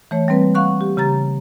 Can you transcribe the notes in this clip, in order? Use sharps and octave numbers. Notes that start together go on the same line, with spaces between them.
E3 A3 C#5
G3 A#3 C4 B4
F5 F#5 C#6 F#6
G4
C#3 G4 A#5 A6